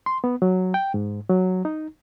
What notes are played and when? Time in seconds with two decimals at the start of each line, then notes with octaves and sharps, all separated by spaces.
0.06 C6
0.24 B3
0.42 F#3
0.74 G5
0.94 G#2
1.29 F#3
1.65 D#4